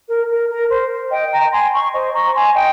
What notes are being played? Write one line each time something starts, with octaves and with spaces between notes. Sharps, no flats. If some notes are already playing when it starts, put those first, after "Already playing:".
A#4
A#4
A#4
C5
D#5 G5
G5 A#5
G#5 C6
A#5 C#6
C5 D#5
A#5 C#6
G#5 C6
D#5 G5